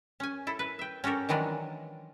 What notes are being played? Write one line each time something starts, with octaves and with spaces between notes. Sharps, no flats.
C#4 G#5
E4 A4
B4
E5 G5
C#4 F#4 G4 A4 A#4
D#3 E3 F#3 G#3 D4